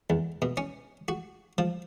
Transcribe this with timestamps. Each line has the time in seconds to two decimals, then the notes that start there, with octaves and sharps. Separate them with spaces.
0.10 E2
0.42 B2
0.57 C#4
1.08 F#4
1.58 F3